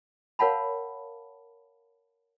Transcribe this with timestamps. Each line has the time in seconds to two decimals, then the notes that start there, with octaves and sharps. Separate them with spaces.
0.39 A#4 C#5 F5 F#5 A5 B5